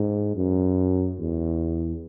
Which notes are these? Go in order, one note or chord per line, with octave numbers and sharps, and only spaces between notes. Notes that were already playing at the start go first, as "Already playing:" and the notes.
Already playing: G#2
F#2
E2